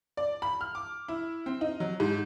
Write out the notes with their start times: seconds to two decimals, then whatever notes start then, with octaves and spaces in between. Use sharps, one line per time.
0.17 D5
0.42 B5
0.61 F6
0.75 D6
1.09 E4
1.46 C4
1.61 D#4
1.80 F#3
2.00 G#2